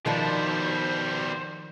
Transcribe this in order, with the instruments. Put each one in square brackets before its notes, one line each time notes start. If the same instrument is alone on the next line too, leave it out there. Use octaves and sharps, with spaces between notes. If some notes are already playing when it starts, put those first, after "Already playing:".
[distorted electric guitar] B2 G3 [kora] D#3 F3 D4 [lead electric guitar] C5